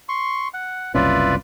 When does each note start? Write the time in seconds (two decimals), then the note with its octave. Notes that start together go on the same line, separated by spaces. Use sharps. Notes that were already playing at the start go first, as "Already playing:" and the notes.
0.09 C6 C#6
0.54 F#5
0.95 F#1 C2 C#4 F4 B4 D5 E5